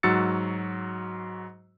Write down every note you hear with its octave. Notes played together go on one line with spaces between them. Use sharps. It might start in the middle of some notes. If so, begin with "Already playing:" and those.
G#2 F#3 F#4 E6 A6 C#7